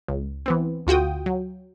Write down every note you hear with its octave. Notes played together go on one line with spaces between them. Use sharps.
C#2
E3 B3 C4
D2 F4 F#4 G5 D#6
F#3